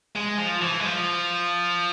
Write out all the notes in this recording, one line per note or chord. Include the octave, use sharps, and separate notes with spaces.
G#3
F3
E3
G#3
F3